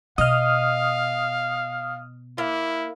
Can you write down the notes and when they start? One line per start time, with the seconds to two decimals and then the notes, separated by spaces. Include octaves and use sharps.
0.18 B2 D#5 F5 D#6 F6
2.38 A#3 E4